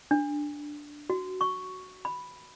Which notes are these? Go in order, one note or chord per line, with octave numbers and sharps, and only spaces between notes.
D4
F#4
C#6
B5